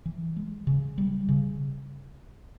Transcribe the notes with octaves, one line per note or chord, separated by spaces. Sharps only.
E3
G#3
C#3
G3
C#3